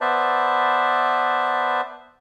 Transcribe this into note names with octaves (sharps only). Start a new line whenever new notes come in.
B3 B4 C5 D5 E5 A5